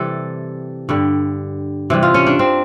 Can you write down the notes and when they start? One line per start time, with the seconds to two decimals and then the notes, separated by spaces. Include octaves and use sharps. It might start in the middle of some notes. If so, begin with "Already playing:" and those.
Already playing: C3 E3 G3 A4
0.89 G2 D3 G3
1.90 C3 E3 G3
2.03 F4
2.14 C#4
2.27 D4
2.39 C4